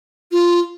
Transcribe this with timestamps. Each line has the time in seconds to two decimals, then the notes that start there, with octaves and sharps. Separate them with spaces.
0.32 F4